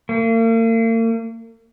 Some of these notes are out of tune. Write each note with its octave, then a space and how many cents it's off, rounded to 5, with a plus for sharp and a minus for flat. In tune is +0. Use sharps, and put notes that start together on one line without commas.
A#3 -45